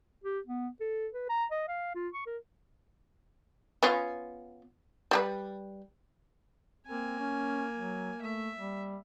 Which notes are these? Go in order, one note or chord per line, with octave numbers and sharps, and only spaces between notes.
G4
B3
A4
B4
A#5
D#5
F5
F4
C#6
A#4
B3 C#4 F4
G3 G4 B4
A#3 C4 G#5
C#4
F#3
A3 E5
G3